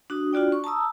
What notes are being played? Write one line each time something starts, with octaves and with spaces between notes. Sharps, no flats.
D4 F#4 D#6
D4 F4 F#4 D5 G5
C#6
A5 A#5 D#6 E6